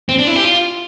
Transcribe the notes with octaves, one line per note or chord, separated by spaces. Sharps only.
C4
D4
E4
G4
F4